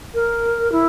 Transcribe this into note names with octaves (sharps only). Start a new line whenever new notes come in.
A#4
E4